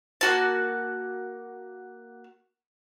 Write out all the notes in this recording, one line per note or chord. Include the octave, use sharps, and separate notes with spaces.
A#3 F#4 A5